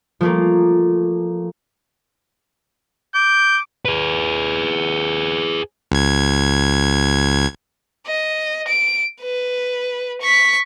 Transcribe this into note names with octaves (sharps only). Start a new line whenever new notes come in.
F3 A3 A#3
D6 G6
G#4 B4
C#2 G#6
D#5
D7
B4
C#6 B6